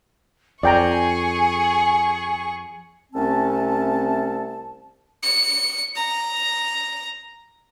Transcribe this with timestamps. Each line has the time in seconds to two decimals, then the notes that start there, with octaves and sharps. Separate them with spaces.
0.63 F2 G#4 D5 G5 G#5 A#5 C#6
3.13 C2 A3 C4 C#4 A5
5.23 C#7
5.96 A#5